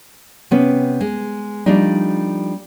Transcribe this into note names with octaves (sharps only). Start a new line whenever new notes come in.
C3 B3 C#4
G#3
F3 G3 A3 D4 D#4